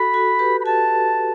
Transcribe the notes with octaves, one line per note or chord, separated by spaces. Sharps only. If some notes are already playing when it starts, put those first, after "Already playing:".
Already playing: F#4 A4 B5
F#4 A4
G4 B4
B5
F#4 A4 A5